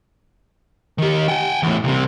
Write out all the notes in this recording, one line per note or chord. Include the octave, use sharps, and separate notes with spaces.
D#3 G4
F#5 G5
E2 A2
C2 C3